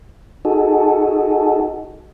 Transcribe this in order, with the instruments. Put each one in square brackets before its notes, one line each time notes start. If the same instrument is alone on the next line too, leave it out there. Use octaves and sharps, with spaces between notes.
[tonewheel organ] D#4 F#4 G#4 A4